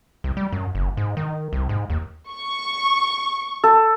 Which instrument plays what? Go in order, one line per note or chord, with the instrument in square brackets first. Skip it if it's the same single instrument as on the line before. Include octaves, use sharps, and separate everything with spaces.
[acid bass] C2
G3
F#2
F#1
G#2
D#3
C2
G#2
D#2
[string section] C#6
[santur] A4